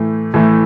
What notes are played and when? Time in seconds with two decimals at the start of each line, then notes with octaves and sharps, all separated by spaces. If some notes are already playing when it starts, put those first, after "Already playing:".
Already playing: A2 E3 A3
0.34 A2 E3 A3